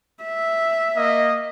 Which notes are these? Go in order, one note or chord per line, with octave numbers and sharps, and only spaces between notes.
E5
A#3 D#5